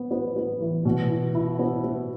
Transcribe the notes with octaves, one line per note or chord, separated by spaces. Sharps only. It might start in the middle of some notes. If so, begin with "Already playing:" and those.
Already playing: B3
B3
B3
E3
B2
E4
E4
B3
B3